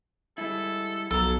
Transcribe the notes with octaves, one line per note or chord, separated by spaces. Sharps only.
G3 G#3 E4 A4
B1 F3 A4 A#5